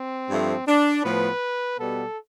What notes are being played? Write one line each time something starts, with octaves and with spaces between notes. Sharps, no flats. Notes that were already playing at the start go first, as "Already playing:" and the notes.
Already playing: C4
G2 F3 A3
D4
A2 F3 B3 B4
B2 G3 B3 A4